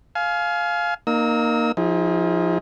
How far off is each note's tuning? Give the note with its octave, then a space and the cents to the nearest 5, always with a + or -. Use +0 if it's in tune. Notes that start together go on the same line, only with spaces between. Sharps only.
F5 +0 G#5 +35
A#3 +0 D#4 -25 E6 -40
F3 +0 D#4 +40 G#4 -25